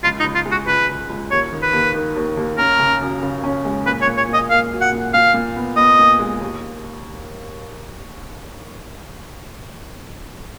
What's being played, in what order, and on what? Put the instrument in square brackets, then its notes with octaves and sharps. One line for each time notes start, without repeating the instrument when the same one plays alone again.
[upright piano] C#2 [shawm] F4
[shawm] D#4
[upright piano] C#2
[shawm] F4
[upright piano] G#3
[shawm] F#4
[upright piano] C#2 [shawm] B4
[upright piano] C#2
C#2
[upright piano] D#2 [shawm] C#5
[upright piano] D#3
[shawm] B4
[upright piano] D#2
D#3
D#2
D#2
[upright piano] C#4 [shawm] A#4
[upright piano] C#3
F#2
C#3
C#4
G#3
[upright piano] A#2 [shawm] B4
[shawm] C#5
[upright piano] A#2
[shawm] C#5
[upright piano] A#2
[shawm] D#5
[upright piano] A#3 [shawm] F5
[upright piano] F#3
[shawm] F#5
[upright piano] A#2
[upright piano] A#2 [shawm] F5
[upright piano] A#2
B3
[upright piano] B3 [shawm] D#5
[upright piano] A#2
G#3
D#2